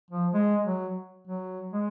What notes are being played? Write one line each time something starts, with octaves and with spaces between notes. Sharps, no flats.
F3
G#3
F#3
F#3
G#3